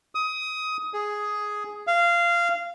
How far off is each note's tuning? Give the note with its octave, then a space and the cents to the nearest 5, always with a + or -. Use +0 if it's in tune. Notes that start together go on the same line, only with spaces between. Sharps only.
D#6 +20
G#4 +5
F5 -15